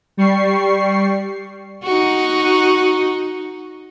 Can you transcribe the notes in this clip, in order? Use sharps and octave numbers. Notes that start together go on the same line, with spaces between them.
G3 C#6 C7
D#4 F#4